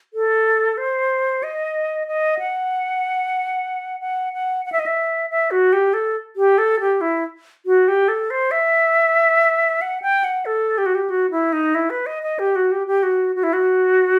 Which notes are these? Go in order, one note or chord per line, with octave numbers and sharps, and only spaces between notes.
A4
C5
D#5
D#5
F#5
F#5
F#5
F#5
E5
D#5
E5
E5
F#4
G4
A4
G4
A4
G4
E4
F#4
G4
A4
C5
E5
F#5
G5
F#5
A4
G4
F#4
G4
F#4
E4
D#4
E4
B4
D#5
D#5
G4
F#4
G4
G4
F#4
F#4
E4
F#4